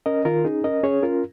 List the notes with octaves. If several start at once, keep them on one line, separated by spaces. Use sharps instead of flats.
C#4 A#4 D#5
D#3 F4 A#4
C#4 D#4 G#4
C#4 A#4 D#5
C#4 G#4 C#5
C#4 F4 A#4